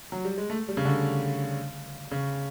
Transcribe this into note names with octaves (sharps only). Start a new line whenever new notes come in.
F#3
G3
G#3
A3
G3
C#3
D3
C#3